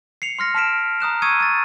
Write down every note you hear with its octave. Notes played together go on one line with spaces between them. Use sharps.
C7 C#7 F7
C6 F6 A#6 C#7
A5 C6 F6 B6 D7 E7
A#5 D#6 F#6 E7
C#6 D#6 E6 G#6 C#7 D#7
C#6 A6